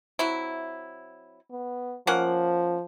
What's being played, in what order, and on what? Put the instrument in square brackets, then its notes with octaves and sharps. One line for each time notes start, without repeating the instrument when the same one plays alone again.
[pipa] F#3 C4 E4
[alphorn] B3
[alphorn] F3 [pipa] A#3 C#4 F#5